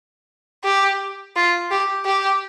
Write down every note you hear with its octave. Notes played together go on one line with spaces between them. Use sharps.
G4
F4
G4
G4